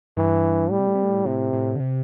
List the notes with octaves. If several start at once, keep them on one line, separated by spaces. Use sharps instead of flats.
G2 E3
A2 G3
C3
A2
C3
A2
A2 C3
A2
D3
C3